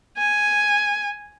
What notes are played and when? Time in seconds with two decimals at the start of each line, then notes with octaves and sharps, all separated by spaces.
0.18 G#5